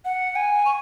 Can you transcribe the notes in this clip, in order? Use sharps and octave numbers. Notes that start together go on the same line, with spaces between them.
F#5
G#5
C#6